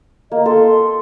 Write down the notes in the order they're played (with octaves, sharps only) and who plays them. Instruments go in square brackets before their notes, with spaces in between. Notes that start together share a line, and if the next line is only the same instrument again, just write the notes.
[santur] A#3 [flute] D#5
[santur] A4 [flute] C6